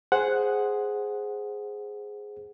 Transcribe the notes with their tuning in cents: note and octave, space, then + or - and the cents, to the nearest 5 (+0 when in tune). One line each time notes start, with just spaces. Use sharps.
G#4 +0 C5 +0 F#5 +0